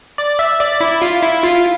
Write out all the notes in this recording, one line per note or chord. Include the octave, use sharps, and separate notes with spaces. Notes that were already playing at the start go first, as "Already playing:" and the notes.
D5
E5
D5
E4
F4
E4
F4